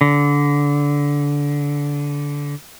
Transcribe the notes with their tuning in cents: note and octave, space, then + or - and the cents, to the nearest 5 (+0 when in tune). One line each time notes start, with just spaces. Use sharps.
D3 -20